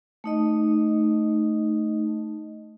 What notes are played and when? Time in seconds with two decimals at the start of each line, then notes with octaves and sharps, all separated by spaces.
0.24 A3 D#4 D#5